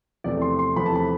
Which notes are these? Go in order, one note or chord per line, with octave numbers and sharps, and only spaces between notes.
E2 C3 F3 A3 D5
C6
C6
E2 C3 F3 A3 B5
A5
B5